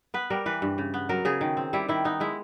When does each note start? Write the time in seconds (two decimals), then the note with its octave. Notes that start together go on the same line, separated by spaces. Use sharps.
0.14 B3 B4
0.30 G3 A#4
0.46 E3 B4
0.62 G2
0.78 C#3
0.94 B3
1.09 F#3 A#4
1.25 C#3 G#4
1.41 D#3
1.57 C4
1.73 G3 E4
1.89 D#3 E4
2.05 B3 D#4
2.20 G#3 E4